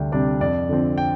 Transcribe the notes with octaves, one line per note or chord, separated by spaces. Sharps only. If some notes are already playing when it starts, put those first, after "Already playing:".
Already playing: D2 C3 G3 D4 G5
C3 G3 D4 D5
F2 D5
D3 F3 C4
G5